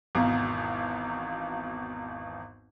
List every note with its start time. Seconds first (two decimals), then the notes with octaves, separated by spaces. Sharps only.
0.15 G#1 E2 B2 F5 A#5